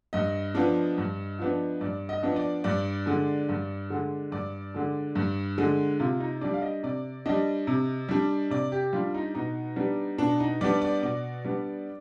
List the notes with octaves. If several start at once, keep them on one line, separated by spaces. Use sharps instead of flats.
G2 D#5
F3 B3 D4
G2
F3 B3 D4
G2 D5
D#5
F3 B3 D4
D5
G2 D5
D3 G#3
G2
D3 G#3
G2 D5
D3 G#3
G2
D3 G#3
C3 F4
D#4
G3 D4 D5
F5
D#5
C3 D5
G3 D4 D#5
C3
G3 D4
C3 D5
G4
G3 D4 F4
D#4
B2 D#4
G3 B3 D4
B2 D4
D#4
G3 B3 D4 D5
D5
B2 D5
G3 B3 D4